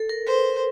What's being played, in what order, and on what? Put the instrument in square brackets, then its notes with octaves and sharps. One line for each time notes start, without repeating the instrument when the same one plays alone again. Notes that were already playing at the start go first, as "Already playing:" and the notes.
Already playing: [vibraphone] A4
A#4
[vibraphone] B4 [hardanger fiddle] C5